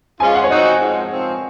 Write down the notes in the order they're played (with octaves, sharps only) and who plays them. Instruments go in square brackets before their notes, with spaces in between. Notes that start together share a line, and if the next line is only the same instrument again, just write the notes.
[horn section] F3 G#3 C#4 F4 [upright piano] G#5
[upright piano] F#5
C#5
[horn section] F3 C4 D#4 F#4 [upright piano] D#5
[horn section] G#2 F3 C4
G#2 F3 C4